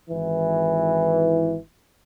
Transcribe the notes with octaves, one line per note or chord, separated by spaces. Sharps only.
G#1 E3